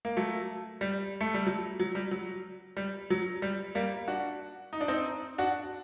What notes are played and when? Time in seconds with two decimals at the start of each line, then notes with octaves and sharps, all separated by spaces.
0.05 A#3
0.17 F#3 A3
0.81 G3
1.21 A3
1.34 G3
1.47 F#3
1.80 F#3
1.95 G3
2.11 F#3
2.77 G3
3.10 F#3
3.42 G3
3.75 G3 A#3
4.08 D4 F#4
4.73 D#4
4.81 D4
4.88 C4 D#4
5.38 D4 F#4